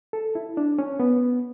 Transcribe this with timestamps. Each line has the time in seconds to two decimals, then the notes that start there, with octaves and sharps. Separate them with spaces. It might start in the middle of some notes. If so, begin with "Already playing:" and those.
0.13 A4
0.35 E4
0.57 D4
0.79 C#4
1.00 B3